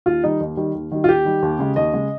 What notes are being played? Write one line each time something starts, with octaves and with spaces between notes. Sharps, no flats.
D#2 F4
D#3 G3 D#4
D#2
D#3 G3
D#2
D#3 G3
F4
D#2 G4
D#3 G3
D#2
C#3 G#3
D#2 D#5
C#3 G#3